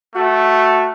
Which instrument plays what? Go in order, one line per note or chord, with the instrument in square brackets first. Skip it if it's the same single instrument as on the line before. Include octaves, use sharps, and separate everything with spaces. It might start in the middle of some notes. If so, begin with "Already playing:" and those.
[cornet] A3 [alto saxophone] F#4